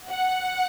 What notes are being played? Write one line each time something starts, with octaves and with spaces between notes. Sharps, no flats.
F#5